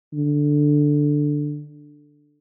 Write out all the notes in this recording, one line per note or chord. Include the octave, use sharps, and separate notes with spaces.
D3